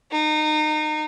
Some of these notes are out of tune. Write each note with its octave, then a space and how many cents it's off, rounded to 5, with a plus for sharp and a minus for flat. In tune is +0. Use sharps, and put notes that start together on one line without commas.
D#4 -25